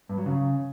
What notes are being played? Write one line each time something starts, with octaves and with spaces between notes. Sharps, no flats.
G2
F#3
C#3